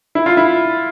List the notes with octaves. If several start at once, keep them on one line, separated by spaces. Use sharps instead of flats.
E4
F4
E4